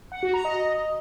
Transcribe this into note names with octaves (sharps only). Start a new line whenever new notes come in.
F#5
F#4
A#5
D#5